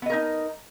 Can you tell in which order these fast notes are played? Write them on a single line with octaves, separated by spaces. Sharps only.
B3 D#5 A#4 D#4